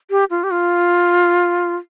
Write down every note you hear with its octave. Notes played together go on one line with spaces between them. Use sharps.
G4
F4
G4
F4